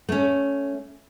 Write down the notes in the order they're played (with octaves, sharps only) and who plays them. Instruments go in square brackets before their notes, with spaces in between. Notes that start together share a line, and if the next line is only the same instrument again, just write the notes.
[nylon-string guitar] A3 C#4